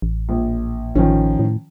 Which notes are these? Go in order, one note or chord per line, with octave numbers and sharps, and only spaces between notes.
A1
A#1
A1 D#3 F3 C#4
A2